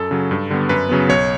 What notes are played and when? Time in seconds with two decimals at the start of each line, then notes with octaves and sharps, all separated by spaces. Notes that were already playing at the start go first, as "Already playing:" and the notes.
Already playing: F#2 A4
0.11 C#3 F#3
0.31 G2
0.51 D3 G3 B3
0.69 F#2 B4
0.89 C#3 F#3 B3
1.09 B1 C#5